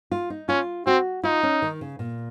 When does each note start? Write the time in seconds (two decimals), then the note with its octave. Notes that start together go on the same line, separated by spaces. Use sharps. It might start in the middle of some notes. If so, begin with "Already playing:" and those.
0.11 F4
0.30 D#4
0.49 C#4 F4
0.86 C4 F#4
1.24 D#4 F4
1.43 C#4
1.62 D#3
1.81 C#3
1.99 A#2